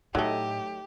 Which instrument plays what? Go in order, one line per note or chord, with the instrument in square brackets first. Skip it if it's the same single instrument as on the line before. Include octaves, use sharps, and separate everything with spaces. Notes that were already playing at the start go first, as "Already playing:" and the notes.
[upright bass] A2 [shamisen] F#3 A3 [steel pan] D#4 A4 D#5 [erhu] G4